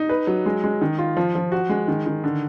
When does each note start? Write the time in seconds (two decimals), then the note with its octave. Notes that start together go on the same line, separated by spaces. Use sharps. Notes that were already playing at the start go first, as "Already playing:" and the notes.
Already playing: D#4
0.09 B4
0.27 F#3
0.46 G#3
0.64 G#3
0.81 D#3
0.98 F4
1.17 F3
1.35 F3
1.52 F#4
1.69 G#3
1.88 D#3
2.06 D#3
2.24 D3